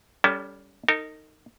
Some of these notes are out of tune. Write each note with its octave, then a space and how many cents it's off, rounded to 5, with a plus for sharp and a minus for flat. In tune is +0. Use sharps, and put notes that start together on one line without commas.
G3 +0 C#4 +30 A4 +0
D#4 +0 A#4 -45